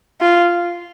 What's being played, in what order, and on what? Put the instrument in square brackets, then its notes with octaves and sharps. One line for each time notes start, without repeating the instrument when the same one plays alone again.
[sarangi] F4